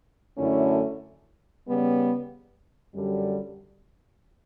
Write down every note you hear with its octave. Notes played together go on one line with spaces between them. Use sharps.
F#2 D3 A3 C#4 E4
C#3 G3 B3
F#2 D3 G3